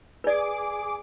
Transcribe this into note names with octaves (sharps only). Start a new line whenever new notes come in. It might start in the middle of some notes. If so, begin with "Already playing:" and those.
G#4 B4 D5 D6